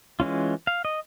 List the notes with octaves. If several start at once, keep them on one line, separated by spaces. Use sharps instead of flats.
E3 G#3 C#4 F4
F5
D#5